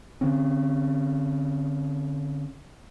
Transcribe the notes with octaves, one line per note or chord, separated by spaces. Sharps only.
D3 C4 C#4